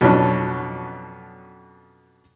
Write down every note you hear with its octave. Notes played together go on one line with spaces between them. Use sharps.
F2 B2 F#3 C#4 D4